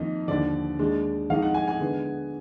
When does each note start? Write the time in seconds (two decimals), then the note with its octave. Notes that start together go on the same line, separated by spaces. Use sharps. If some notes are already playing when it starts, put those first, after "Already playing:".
Already playing: F2 D#3 A#3 D#4
0.28 D#2 D3 F3 D5
0.79 D#2 D#3 G#3 D4
1.30 F2 D#3 G#3 D#4 F5
1.42 F#5
1.54 G#5
1.68 G#5
1.80 D3 G#3 B3